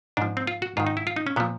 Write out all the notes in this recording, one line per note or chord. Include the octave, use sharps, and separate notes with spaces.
G#2 F3 D4
C4
F4
F#4
G#2 D#3 F4
D#4
E4
F4
D#4
C#4
A#2 F3 B3